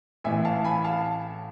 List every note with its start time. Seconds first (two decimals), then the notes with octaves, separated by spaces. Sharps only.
0.24 A1 A2 E3 E5 G#5
0.45 F5 A5
0.65 G#5 B5
0.84 F5 A5